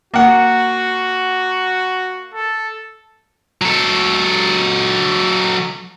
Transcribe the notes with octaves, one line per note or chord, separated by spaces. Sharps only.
A#3 F#4 F#5
A4
F#3 A4